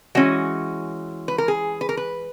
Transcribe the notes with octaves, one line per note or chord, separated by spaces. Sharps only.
E3 G#3 C#4 F#4
B4
A#4
G#4
B4
A#4
B4